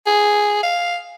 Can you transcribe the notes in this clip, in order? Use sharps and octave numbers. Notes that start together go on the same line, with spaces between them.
G#4
F5